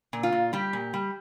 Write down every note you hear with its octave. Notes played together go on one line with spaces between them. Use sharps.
A#2
F4
A#2
G3 G4
A#2
G3